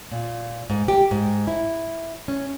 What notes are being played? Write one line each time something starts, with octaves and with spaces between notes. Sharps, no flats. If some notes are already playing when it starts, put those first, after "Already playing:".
A#2
G#2
G4
G#2
E4
C#4